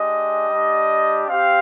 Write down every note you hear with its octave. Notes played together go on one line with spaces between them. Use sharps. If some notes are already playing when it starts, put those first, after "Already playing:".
Already playing: G#3 D4 G4 D#5
G3 D4 G4
C4 G4 F5